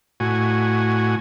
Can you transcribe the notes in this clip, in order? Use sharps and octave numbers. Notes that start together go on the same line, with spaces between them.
A2 F#4 G#5